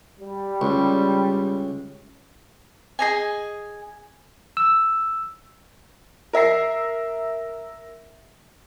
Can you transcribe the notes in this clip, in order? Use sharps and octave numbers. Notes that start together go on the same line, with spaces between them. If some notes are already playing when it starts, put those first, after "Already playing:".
G3
C#2
G#4 D#5 G#5
E6
A#4 E5 A#6 C7